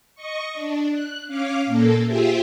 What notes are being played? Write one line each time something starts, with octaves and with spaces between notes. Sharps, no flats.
D#5 C#6
D4
F#6
C#4 F5 D6
A#2 A#3 A4
F4 G4 G#4 C5 E5